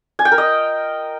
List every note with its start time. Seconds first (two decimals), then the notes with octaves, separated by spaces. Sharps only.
0.19 G#5
0.25 G5
0.32 A#4
0.38 D#5